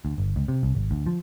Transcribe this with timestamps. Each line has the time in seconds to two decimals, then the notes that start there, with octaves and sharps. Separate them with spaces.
0.05 D2
0.18 G1
0.36 C#2
0.48 C3
0.63 C2
0.75 G#1
0.91 D2
1.06 F3